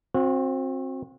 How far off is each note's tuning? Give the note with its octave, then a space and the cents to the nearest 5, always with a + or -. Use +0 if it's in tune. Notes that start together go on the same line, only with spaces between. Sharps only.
C4 +20 F#4 -35